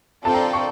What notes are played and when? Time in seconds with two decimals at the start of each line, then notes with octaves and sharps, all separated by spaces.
0.25 C4 F4 A4 D5 G5 A5
0.34 A#5
0.53 C#6